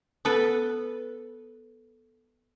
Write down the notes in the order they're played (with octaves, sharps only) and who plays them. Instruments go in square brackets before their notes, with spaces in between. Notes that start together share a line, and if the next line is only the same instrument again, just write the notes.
[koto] B3 A4 B4